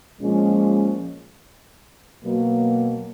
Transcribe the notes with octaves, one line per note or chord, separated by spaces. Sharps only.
A#2 F3 G#3 C#4
B2 F#3 A#3